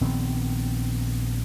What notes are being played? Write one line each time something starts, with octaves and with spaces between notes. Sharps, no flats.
A#1 D#3 B3 C4